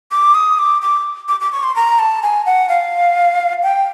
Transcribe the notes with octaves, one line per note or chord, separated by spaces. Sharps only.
D6
D#6
D6
D6
D6
D6
C#6
C6
A#5
A5
G#5
F#5
F5
G5